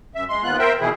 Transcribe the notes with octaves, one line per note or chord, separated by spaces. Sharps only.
F#2 E5
G#3 C6
D#2 B3 F4 F#6
A#4 C5 E5 G5
B2 D#3 E3 E4 G#4